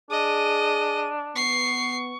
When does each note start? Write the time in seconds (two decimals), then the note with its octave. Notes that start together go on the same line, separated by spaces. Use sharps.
0.11 D4 G#4 D#5 D#7
1.35 B3 C#6 C7